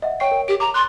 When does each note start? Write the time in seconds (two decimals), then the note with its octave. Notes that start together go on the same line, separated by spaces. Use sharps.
0.02 D#5 E5 F#5
0.20 C#5 G5 C#6 C7
0.31 A#4
0.48 G4 D7
0.60 A#5 D6
0.74 C6 F#6 A6